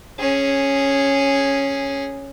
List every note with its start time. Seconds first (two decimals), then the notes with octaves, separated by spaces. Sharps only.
0.19 C#4 G#4